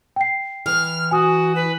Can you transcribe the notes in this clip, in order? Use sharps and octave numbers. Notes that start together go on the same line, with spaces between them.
G5 C7
E3 F6
F#4 G#5 D#6
B4